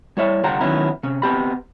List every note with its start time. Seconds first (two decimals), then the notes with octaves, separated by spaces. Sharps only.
0.17 G3 E4 C#5 E5
0.43 C2 D3 F4 G4 F#5 A#5
0.61 D#3 F#3 B3 C#4 E4
1.03 C3 C#4
1.22 B3 C4 G4 B5